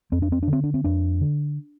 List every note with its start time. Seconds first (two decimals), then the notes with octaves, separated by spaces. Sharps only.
0.12 F2 C4
0.22 D4
0.32 C4
0.43 D4
0.48 D3
0.53 C4
0.64 D4
0.74 C4
0.84 F2 D4
1.21 D3